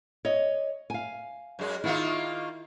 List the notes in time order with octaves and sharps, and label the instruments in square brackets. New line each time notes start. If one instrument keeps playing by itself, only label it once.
[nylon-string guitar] C#5 D#5
F5 G#5
[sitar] F#2 G#3
[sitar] D#3 A#3 F4 [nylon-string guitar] E4